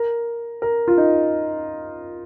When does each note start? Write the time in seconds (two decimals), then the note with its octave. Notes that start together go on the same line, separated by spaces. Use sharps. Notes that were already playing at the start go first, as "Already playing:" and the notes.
Already playing: A#4
0.62 A#4
0.88 F4
0.98 D#4